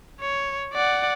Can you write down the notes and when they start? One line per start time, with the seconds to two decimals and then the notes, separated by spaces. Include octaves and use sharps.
0.21 C#5
0.74 D5 F#5